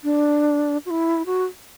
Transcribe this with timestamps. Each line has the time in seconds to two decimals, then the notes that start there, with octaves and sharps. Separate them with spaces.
0.04 D4
0.86 F#4
0.90 E4
1.26 F#4